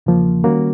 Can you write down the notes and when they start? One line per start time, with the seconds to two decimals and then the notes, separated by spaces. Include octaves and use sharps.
0.06 E2 C#3 F3 A#3
0.44 D#3 G3 A#3 C#4 F#4